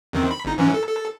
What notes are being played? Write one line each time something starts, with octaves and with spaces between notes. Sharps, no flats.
E2 D#3 C4
B5
G1 D#4
G#2 E3 C#4
A4
A4